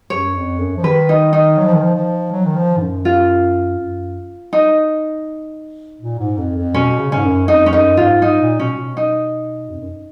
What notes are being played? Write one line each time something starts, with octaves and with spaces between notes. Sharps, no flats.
F#2 C#5
F2
F#2
F3
D#3 B4
D#4
D#4
F#3
F3
D#3
F3
F3
F#3
D#3
F3
G#2
F#2
F4
F#2
D#4
A#2
G#2
F2
F2
B2 C#4
C#3
G#2 C#4
F#2
F2 D#4
C#4
F#2 D#4
G#2 F4
G#2 D#4
A#2
B2 C#4
B2
D#4
F2
F#2